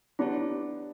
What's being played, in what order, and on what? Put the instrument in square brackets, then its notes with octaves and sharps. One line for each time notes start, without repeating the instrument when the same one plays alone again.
[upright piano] B3 D4 [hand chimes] E4 G4 C#5